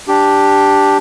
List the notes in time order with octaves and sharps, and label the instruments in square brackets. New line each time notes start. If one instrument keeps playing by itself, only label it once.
[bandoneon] D4 G4